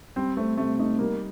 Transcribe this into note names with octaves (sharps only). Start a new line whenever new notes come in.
G3 C4
A3 C4
C3 A3
A3 D#4
G3 A#3